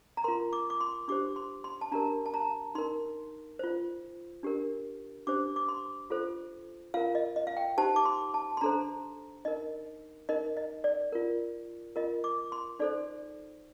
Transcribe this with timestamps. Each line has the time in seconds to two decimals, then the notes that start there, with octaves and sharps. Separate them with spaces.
0.17 A#5
0.24 F4 A#4 C6
0.53 D6
0.70 D6
0.80 C6
1.08 D4 G4 C5 D6
1.36 C6
1.64 C6
1.81 A5
1.92 D4 G4 A#4 A#5
2.26 A5
2.34 A#5
2.75 D#4 A#4 C6
3.59 F4 C5
4.43 D4 G4 A#4
5.27 D4 G4 C5 D6
5.56 D6
5.68 C6
6.10 F4 A4 C5
6.94 F4 A#4 F5
7.15 D#5
7.36 D#5
7.47 F5
7.57 G5
7.77 D#4 G4 C5 A5
7.96 D6
8.05 C6
8.34 A5
8.57 C6
8.61 D4 A4 C5 A#5
9.45 D#4 A#4 D#5
10.29 D#4 A#4 D#5
10.57 D#5
10.84 D5
11.12 F4 A#4
11.96 F4 A#4 D#5
12.24 D6
12.52 C6
12.79 D#4 A4 C5 D5